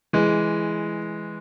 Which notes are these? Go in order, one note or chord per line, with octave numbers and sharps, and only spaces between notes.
E3 G#3